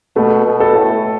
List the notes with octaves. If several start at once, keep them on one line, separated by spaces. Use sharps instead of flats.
B2 A3
B2
A4
A2